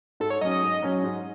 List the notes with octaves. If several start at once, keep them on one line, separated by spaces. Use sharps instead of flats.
G#2 A4
C#5
F#3 C#4 D#5
D#5
G#2
F#3 C#4
G#2